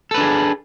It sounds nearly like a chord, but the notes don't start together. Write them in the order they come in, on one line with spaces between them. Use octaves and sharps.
A4 B4 D4 G#4